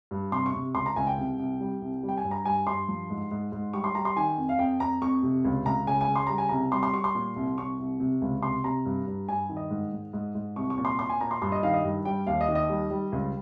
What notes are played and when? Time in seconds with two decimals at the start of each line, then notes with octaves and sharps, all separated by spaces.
0.11 G2
0.32 C3 C6
0.46 C#6
0.54 C3
0.75 C#2 C6
0.86 A#5
0.96 C#2 G#5
1.07 G5
1.18 C2
1.39 C2
1.60 G3
1.82 C2
2.03 G3
2.09 G5
2.17 G#5
2.24 G2
2.31 A#5
2.45 G2 G#5
2.67 G2 C6
2.88 F3
3.10 G#2
3.31 G#2
3.52 G#2
3.73 G3 C#6
3.84 C6
3.95 G3 A#5
4.05 C6
4.16 D#3 G#5
4.37 F2
4.49 F5
4.59 F2 G5
4.80 F2 A#5
5.02 F2 C#6
5.23 C3
5.45 C#2
5.66 C#2 A#5
5.87 C#3 G#5
6.01 G#5
6.08 C#3
6.16 C6
6.27 G3 A#5
6.38 G#5
6.49 C2 A#5
6.72 G3 C6
6.83 C6
6.93 G3 C#6
7.04 C6
7.15 A#2
7.36 C2
7.58 C2 C#6
7.79 C2
8.00 C3
8.22 C#2
8.43 C3 C6
8.64 C3 A#5
8.86 G2
9.07 G2
9.28 G2 G#5
9.49 D#3
9.57 D#5
9.70 G#2
9.92 G#2
10.13 G#2
10.35 G#2
10.56 C2 C#6
10.70 C#6
10.78 A#2
10.85 C6
10.99 A#2 C6
11.09 G#5
11.21 A#2 A#5
11.31 C6
11.42 G2 C6
11.52 D#5
11.63 D#3 F5
11.74 D#5
11.84 G2
12.05 G3 G5
12.27 D#2 F5
12.41 D#5
12.49 D#3
12.55 D#5
12.69 G3
12.91 G3
13.12 C#2